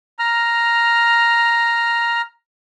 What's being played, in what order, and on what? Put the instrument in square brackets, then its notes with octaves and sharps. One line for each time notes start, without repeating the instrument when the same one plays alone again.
[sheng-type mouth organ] A#5 F6